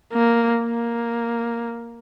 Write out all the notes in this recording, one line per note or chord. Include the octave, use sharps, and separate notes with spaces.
A#3
A#3